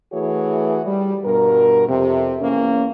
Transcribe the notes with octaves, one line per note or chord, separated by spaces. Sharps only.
E3 A3 F#4 G#4 C#5
G3
G2 B2 A#4
F2 C3
E2 A#3 C#4